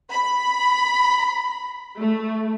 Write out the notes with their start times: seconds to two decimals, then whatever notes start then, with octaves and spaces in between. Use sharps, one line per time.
0.10 B5
1.99 A3